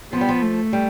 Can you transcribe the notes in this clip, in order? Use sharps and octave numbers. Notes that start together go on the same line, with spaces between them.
F3 B3
G3
F3
A3
G3